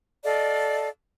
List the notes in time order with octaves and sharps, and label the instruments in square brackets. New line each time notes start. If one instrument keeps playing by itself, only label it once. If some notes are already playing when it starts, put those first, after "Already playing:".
[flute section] A4 D5 D#5 F5